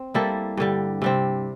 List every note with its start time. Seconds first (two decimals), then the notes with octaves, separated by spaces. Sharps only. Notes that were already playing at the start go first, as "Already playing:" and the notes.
Already playing: C4
0.14 G3 A#3 E4 A4
0.57 G2 D3 G3
1.02 C3 G3 C4